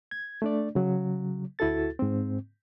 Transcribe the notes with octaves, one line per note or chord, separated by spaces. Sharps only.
G#6
A3 D4 D5
C#3 F#3
D2 E4 F#4 A4 A6
G#2 C4